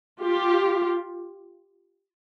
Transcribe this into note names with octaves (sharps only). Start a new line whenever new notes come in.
F4 G4